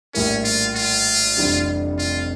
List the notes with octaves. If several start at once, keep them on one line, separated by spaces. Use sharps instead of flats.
A#1 A2 G3 A#3 C#4 E4
F4
F4
F1 F2 E3 G3 D4
F4